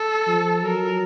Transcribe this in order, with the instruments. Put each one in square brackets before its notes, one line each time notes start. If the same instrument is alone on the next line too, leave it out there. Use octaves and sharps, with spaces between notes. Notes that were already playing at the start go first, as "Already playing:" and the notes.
Already playing: [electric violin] A4
[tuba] F3
[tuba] F#3 [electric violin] A#4